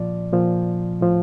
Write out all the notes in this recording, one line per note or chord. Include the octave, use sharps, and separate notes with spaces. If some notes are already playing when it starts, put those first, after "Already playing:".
Already playing: A#2 F3 D5
A#2 F3
A2 F3